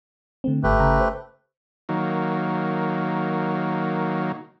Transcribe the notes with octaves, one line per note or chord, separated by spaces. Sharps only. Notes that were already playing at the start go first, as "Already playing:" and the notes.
D3 A3 C4
G1 G#2 A3 G4 B4
G1 C#3 A#5
C5
D#3 F#3 A#3